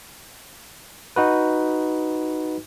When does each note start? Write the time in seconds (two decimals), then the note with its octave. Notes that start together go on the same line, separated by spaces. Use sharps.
1.16 D#4 F#4 B4